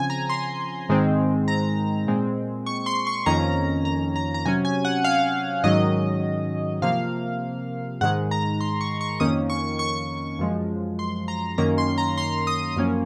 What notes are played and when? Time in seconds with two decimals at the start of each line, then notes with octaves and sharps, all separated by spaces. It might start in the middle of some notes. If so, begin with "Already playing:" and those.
Already playing: C#3 F3 C4 G#5
0.10 A#5
0.29 C6
0.89 G#2 D#3 G#3 C4
1.48 A#5
2.07 A#2 G#3 C4
2.66 C#6
2.86 C6
3.07 C#6
3.26 F2 D#3 A#3 C#4 A#5
3.85 A#5
4.16 A#5
4.34 A#5
4.45 C3 F#3 C#4 G#5
4.65 G#5
4.85 F#5
5.04 F5
5.64 G#2 D#3 F#3 C#4 D#5
6.82 C3 F3 A#3 F5
8.01 G#2 D#3 G#3 F#5
8.31 A#5
8.61 C6
8.81 C#6
9.01 C#6
9.20 F2 D#3 A#3 C#4 D#6
9.50 C#6
9.79 C#6
10.39 F#2 F3 G#3
10.99 C6
11.28 A#5
11.58 F#2 D#3 A#3 C#4 A#5
11.78 C6
11.98 A#5
12.18 C6
12.47 D#6
12.76 F#2 F3 A#3 C#4